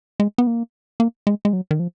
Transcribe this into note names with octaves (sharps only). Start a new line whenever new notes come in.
G#3
B3
A#3
A#3
G#3
G#3
F#3
D#3
F3